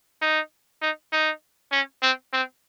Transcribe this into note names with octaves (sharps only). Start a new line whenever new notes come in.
D#4
D#4
D#4
C#4
C4
C4